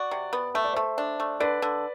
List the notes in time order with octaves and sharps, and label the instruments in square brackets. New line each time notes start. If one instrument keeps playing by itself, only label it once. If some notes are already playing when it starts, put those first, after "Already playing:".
Already playing: [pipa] F#4 [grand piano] D5 F#5
[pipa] C3
B3
[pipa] A3 [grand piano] E5
[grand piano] D5
[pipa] A3 [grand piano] C5 E5
[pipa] D4
A3
[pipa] D3 [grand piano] B4 D5
[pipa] D3